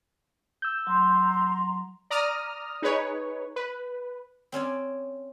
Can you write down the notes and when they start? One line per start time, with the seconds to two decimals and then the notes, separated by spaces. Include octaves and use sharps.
0.62 E6 G6
0.87 F#3 A#5 C6
2.10 D5 A#5 D#6 F6
2.82 D#4 G#4 B4 C#5
3.56 B4
4.52 C4 C#4 D5 G#5